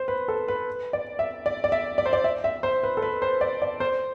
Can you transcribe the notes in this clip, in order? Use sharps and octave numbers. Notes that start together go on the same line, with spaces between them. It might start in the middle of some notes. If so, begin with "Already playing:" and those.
Already playing: C5
B4
A4
B4
D5
E5
D5
D5
E5
D5
C5
D5
E5
E5
C5
B4
A4
B4
C5
D5
D5
C5